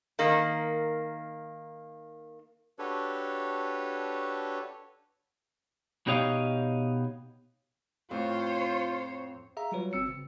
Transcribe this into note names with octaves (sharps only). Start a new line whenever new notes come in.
D#3 A#3
D4 F#4 G4 A4 B4 C#5
B2 D#4 G4 C#5 D#5 F5
F2 A2 F4 C5 C#5
G#4 E5 F5 A#5
F#3 G3 F4 F#4 B4 C#5
G1 C4 E6 C#7
C#3